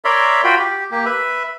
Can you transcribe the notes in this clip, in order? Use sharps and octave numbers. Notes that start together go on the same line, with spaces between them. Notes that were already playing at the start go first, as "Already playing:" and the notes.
A#4 C#5 D5 E5 B5 C6
F4 F#4 G5 B5
G4
A#3 G4
B4 E5